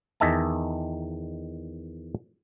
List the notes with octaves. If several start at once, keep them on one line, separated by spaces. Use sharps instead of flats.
E2 D#3 D#5 E5 G#5 A5